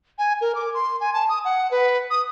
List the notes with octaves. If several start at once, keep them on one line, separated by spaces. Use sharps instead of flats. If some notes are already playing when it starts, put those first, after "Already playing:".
G#5
A#4
D6
C6
G#5
A5
D#6
F#5
B4
D#6